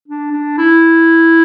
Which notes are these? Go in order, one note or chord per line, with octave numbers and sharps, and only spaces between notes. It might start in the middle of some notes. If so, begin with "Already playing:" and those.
D4
D4
E4